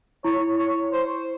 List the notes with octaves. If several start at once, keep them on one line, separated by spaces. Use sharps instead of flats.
E4 C#5
C#5
C5